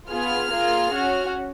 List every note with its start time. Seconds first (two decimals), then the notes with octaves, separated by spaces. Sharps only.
0.10 B3 F4 G#4 F6
0.51 A#3 F4 G#4
0.93 C#4 F#4